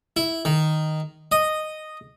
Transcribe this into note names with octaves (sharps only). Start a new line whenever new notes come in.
E4
D#3
D#5